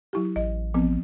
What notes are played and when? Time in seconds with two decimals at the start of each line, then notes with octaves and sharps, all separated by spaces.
0.13 F#3 E4 G4
0.36 A1 D#5
0.74 F3 B3 C4